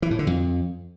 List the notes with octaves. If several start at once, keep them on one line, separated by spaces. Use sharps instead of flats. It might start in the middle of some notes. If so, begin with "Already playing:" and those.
E3
A2
D3
F2